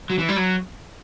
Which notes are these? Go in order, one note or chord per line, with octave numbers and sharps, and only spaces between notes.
F#3
E3
G3
F#3